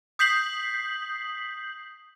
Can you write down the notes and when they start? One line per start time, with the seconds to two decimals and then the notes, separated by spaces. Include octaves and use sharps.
0.19 D#6 G6 B6 C7 F#7